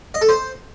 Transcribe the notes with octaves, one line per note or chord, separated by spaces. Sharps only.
D#5
A4
C5